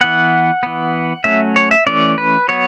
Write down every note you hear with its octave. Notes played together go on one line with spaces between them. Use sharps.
E3 B3 F#5
E3 B3
F#3 A3 C#4 E5
C#5
E5
E3 A3 C#4 D5
B4
F#3 B3 C#5